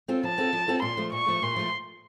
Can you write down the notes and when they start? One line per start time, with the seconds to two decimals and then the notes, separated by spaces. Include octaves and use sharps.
0.08 C4 F4 A4
0.23 F3 A5
0.38 C4 F4 A4
0.53 F3
0.68 C4 F4 A4
0.82 A#2 C6
0.97 F3 A3
1.12 A#2 C#6
1.26 F3 A3
1.42 A#2 C6
1.56 F3 A3